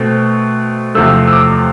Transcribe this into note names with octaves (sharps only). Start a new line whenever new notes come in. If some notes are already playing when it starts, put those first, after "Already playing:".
Already playing: B2 A3 C4
E2 C3 F3 A3 E6
E6
D6